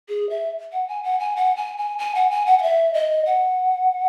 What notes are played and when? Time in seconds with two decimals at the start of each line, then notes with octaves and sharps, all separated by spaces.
0.09 G#4
0.30 E5
0.73 F#5
0.88 G#5
1.04 F#5
1.20 G#5
1.36 F#5
1.57 G#5
1.78 G#5
1.99 G#5
2.15 F#5
2.31 G#5
2.46 F#5
2.59 F#5
2.63 E5
2.94 D#5
3.26 F#5